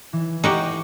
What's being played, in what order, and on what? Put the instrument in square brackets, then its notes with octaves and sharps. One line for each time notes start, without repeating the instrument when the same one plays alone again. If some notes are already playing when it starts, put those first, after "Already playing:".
[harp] E3
[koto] D#4 F#4 G4